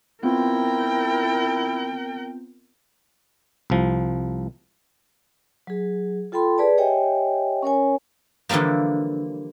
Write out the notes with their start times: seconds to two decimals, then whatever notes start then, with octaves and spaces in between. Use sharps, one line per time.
0.23 B3 C4 E4 F4 A#4 G5
3.70 C2 F3
5.67 F#3 G#4
6.32 F4 A4 G5 B5 C6
6.58 G#4 B4 D5 A5
6.78 G4 C#5 D#5 E5 G5 G#5
7.63 C#4 A#4 C#5 G#5
8.49 D3 E3 F3 G3 A#3